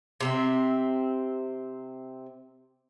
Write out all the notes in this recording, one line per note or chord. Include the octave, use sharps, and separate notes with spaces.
C3 C4 E5